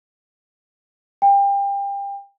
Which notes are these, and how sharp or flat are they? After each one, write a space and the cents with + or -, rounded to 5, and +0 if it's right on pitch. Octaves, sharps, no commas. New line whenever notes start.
G5 +30